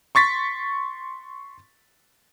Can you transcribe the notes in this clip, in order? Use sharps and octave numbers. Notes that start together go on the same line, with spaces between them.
C6 C#6 A6 B6